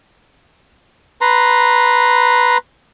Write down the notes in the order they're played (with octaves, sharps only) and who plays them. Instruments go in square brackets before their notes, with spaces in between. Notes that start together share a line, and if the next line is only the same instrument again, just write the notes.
[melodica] B4 A#5 C6